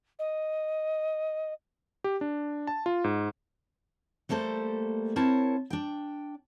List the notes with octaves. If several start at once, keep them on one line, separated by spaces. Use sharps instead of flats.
D#5
G4
D4
A5
F4
G#2
G3 A3 A#3 A4 C5
C4 E4 A#4 C#5 A5
D4 G5